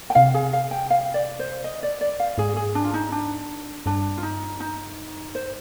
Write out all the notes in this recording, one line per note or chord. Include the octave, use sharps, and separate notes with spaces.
G5
C3 F5
G#4
F5
G5
F5
D5
C5
D#5
D5
D5
F5
G#2 G#4
G#4
D4
F4
D#4
D4
G2 D4
F4
D#4
D#4
C5